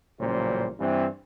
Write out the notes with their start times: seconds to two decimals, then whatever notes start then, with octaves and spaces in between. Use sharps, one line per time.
0.20 A1 A#2 C#3 F#3 G3 C5
0.79 G2 E3 C4